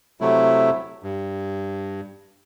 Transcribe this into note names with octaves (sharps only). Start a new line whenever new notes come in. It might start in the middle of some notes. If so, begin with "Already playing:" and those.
C3 F#3 A3 E4
G2